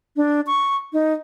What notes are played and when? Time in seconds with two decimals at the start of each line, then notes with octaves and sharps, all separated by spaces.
0.16 D4
0.46 C#6
0.93 D#4